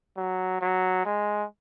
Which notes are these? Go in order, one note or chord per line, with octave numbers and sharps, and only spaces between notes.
F#3
F#3
G#3